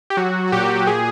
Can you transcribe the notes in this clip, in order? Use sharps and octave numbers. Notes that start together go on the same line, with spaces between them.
G4
F#3 F#4
F#4
A#2 G4
A#2 G#4